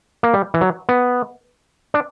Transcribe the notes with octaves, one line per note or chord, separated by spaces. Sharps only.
A#3
G3
E3
F#3
B3
D4